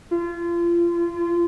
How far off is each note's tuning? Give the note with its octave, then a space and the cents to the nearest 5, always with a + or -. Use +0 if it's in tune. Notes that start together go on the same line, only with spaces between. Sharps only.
F4 -30